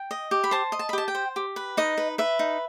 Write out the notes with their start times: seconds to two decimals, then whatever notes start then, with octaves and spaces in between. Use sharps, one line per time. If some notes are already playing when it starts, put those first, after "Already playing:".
Already playing: G5
0.11 D#5
0.31 G4
0.44 B5
0.51 C5 A5
0.72 D#5
0.79 A5
0.89 B5
0.93 G4 A5
1.08 G5
1.15 C5
1.36 G4
1.56 B4
1.77 D#4 D#5
1.97 B4
2.18 B4 E5
2.39 D#4